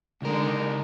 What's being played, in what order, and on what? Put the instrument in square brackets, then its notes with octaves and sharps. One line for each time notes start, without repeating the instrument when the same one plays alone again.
[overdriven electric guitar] C#2 A#4 [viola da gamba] D3 G#3 D#4